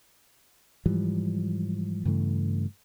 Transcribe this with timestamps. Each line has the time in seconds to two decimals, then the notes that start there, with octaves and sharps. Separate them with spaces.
0.86 G#2 E3 F3 G3
2.05 G2 C#3 E3 A3